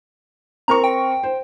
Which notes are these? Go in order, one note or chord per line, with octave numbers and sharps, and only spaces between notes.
C4 A#4 A#5 C#6
G5
C5